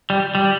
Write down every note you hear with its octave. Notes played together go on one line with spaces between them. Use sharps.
G3
G3